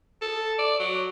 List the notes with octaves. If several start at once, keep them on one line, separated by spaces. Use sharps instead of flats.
A4
D5
F#3